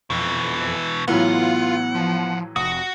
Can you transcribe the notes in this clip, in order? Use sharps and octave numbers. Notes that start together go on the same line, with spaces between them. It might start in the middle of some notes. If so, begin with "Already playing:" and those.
F2 B2 E3
A2 E3 F#3 B3 F4 F#5
F3
F1 F#4 D#6